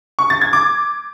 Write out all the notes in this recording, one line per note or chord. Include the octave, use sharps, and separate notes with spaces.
C#6
A6
G#6
D6